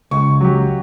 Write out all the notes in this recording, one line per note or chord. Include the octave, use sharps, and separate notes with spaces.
C#2 C#6
F#3 G4